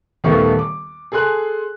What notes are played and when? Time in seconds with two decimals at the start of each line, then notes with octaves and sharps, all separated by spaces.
0.24 D#1 D#3 A3 B3 F5 C#6
0.59 D6
1.12 G#4 A4 G#5 C6 F#6